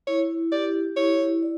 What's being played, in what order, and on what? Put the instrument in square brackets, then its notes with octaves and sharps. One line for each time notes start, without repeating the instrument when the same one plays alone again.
[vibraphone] E4 [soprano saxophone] C#5
[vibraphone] G4 [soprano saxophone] D5
[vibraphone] E4 [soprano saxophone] C#5
[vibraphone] D5